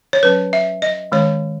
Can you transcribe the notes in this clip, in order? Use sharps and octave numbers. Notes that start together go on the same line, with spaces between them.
C#5
F#3 C#4 B4
E5
D#5
D#3 G#3 C#4 C#5